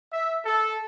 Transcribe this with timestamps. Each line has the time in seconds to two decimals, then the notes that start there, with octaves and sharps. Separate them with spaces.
0.11 E5
0.45 A4